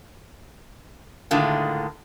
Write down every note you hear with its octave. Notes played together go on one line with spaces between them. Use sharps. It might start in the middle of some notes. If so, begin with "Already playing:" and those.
A2 D3 D#3 G#3 F4